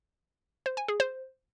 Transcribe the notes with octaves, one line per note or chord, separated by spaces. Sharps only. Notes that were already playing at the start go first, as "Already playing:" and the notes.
C5
G#5
G#4
C5